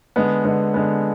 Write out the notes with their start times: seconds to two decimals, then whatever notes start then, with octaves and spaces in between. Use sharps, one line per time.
0.16 D3 G#3 B3
0.45 D3 G#3 B3
0.74 D3 G#3 B3